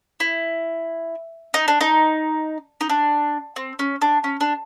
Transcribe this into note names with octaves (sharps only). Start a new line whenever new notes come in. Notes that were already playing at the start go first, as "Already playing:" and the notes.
E4
D#4
D4
D#4
D#4
D4
C4
C#4
D4
C#4
D4